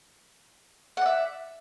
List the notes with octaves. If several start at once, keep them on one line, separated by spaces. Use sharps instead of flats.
D5 E5 F#5